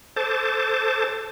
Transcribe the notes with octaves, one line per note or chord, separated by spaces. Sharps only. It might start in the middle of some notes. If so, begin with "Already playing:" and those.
A4 C5 A5 D6